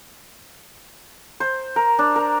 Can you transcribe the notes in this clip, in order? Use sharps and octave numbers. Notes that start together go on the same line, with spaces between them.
C5
A#4
D4
A#4